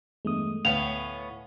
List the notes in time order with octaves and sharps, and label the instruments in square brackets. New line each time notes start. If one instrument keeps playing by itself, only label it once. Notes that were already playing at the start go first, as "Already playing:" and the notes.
[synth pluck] E2 G2 [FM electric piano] G#3 A3 D#6
[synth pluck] D2 [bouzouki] A2 B3 C#4 [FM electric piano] F5 [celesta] F7